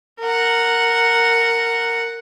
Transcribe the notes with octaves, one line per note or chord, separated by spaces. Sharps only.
A#4 F#5